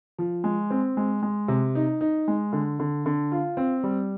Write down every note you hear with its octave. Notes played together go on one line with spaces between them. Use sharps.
F3
G#3
C4
G#3
G#3
C3
D#4
D#4
G#3
D3
D3
D3
F4
C4
G3